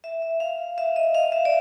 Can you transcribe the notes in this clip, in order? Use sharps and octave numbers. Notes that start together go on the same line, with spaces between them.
E5
E5
F5
E5
D#5
F5
E5
D5